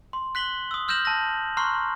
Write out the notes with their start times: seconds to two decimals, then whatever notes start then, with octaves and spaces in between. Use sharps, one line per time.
0.13 C6
0.35 F#6 B6 F#7 G7
0.71 D#6 E6
0.88 E6 F6 G6 A#6 E7 F#7
1.05 A5 E6 A#6
1.57 A#5 C6 C#6 F6 F#6 C7